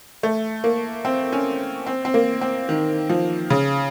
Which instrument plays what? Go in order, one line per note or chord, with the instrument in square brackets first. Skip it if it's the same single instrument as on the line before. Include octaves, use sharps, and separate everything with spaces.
[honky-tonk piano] A3
A#3
C4
C#4
C4
C4
A#3
C4
D#3
F3
C#3